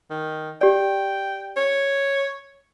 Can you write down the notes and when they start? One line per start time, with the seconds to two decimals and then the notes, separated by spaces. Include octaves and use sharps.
0.10 D#3
0.61 G4 D5 G5
1.57 C#5